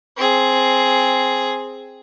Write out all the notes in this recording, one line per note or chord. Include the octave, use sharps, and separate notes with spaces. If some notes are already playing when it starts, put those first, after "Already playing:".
C4 G#4